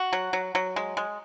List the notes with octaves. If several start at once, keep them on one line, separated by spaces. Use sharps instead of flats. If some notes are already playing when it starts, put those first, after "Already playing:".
Already playing: F#4
F#3
F#3
F#3
G#3
G#3